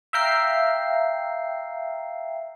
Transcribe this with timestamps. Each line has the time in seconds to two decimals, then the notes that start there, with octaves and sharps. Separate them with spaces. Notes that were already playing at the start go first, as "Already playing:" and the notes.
0.13 E5 F5 G5 A#5 C7